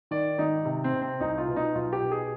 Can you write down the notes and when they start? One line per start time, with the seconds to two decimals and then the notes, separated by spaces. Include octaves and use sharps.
0.11 D#3 D5
0.38 G#1 D#4
0.65 C3
0.84 C4
0.93 C3
1.02 C4
1.20 C2 D#4
1.38 F4
1.48 B2
1.56 D#4
1.75 B1 F4
1.93 G4
2.01 B2
2.11 G#4